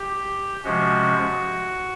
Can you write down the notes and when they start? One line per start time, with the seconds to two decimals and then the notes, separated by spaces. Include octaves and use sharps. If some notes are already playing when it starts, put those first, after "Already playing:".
Already playing: G4
0.63 C3 F3 G#3 C#4 F#4